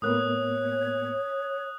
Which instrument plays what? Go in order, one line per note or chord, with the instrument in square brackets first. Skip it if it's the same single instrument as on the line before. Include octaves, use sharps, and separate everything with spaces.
[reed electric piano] A2 A#3 B3 [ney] C#5 [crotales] D#6 F#6